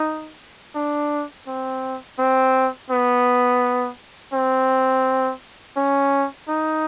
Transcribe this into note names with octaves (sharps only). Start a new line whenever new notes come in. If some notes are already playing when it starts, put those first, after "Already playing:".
Already playing: D#4
D4
C4
C4
B3
C4
C#4
D#4